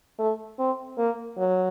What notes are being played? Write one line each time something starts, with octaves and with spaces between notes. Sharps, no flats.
A3
C4
A#3
F#3